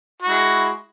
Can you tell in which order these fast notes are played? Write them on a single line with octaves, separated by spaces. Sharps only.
F#4 E4 G#3